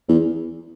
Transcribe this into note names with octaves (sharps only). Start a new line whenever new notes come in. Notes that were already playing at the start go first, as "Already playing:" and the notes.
E2